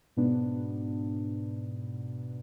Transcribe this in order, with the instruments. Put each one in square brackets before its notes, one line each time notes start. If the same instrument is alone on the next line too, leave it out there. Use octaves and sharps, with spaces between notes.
[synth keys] G#2 B2 B3 D4